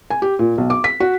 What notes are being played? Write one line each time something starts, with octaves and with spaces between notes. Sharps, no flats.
G#5
G4
A#2
B1
D6
B6
F#4